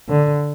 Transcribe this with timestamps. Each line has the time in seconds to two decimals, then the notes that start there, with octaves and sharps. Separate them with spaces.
0.09 D3